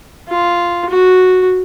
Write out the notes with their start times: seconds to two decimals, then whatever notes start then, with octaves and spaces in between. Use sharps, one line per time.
0.29 F4
0.90 F#4